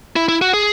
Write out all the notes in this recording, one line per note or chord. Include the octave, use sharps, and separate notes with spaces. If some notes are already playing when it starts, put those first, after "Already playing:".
E4
E4
F#4
G#4